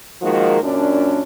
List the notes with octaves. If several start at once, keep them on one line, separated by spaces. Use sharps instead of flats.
D#3 F3 G#3 A#3 F#4 A#4
F#2 A#2 C#4 D4